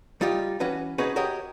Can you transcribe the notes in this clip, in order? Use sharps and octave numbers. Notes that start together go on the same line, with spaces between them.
G3 D#4 F4 G4
E3 C#4 F#4 B4
C#4 D#4 F#4 G#4 B4
F#4 G4 A#4 C#5 D#5